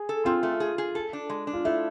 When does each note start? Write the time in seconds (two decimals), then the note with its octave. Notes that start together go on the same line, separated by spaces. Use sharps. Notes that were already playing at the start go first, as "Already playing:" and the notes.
Already playing: G#4
0.09 A4
0.25 C4 F4
0.43 A3
0.60 G#4
0.78 G#4
0.95 A4
1.13 D4
1.30 G#3
1.47 D4
1.53 F4
1.65 A3 E4